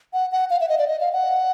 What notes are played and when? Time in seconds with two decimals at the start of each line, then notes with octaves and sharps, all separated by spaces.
0.13 F#5
0.32 F#5
0.50 F5
0.61 E5
0.69 D#5
0.78 D5
0.88 D#5
1.00 F5
1.13 F#5